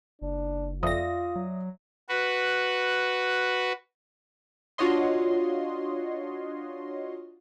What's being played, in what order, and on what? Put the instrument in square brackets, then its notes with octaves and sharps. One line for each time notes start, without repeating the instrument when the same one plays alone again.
[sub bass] F#1 [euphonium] D4
[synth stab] F2 A#6 [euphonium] F4 [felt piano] D5 E5 D#6
[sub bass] F#3
[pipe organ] F#4 B4
[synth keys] D4 F4 F#4 C#5 D#5 C6